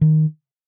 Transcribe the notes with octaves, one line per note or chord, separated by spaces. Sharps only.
D#3